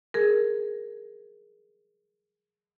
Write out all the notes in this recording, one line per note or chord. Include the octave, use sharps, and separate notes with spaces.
G#4 A#4